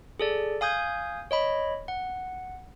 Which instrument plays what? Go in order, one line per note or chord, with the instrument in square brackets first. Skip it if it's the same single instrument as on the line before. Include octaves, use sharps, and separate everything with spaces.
[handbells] G#4 A4 D5
F5 G#5 D#6 G6 G#6
C#5 D#5 B5
F#5